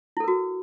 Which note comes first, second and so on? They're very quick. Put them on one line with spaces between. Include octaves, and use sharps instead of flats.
E4 A4 A#4 F#4